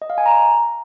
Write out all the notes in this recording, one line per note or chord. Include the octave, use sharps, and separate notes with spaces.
D#5
F5
G#5
A#5